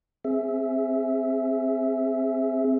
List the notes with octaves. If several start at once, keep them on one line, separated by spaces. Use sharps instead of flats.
C4 G#4 E5